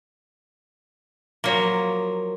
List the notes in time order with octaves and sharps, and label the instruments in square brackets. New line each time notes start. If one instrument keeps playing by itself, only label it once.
[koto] F3 F#3 A#3